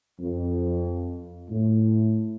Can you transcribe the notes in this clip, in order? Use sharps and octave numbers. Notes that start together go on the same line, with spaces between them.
F2
A2